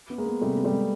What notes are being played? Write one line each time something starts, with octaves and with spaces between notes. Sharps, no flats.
B3
G#3 A#3
B3
C3 G3 A3
B3
G3 A3
G#3